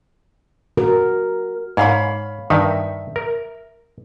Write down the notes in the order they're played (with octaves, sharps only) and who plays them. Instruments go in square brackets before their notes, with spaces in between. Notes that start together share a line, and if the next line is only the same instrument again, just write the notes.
[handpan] F#4 A#4
[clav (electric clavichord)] G#2 [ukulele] C#5 F5 B5
[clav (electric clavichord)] G2 D#3 D#4 [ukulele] E5
[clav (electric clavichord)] A#4